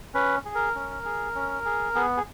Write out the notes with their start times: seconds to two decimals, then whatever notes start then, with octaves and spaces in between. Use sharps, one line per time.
0.14 C#4 B4
0.45 G#4
0.55 A#4
0.75 C#4
1.05 G#4
1.35 C#4
1.65 G#4
1.95 B3 G#4
2.17 G#4